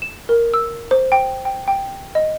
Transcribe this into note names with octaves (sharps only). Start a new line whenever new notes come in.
E7
A#4
E6
C5
G5
G5
G5
D#5